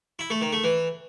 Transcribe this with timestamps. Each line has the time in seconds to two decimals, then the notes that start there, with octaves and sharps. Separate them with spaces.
0.19 E4
0.30 A3
0.41 D#3
0.53 A3
0.64 E3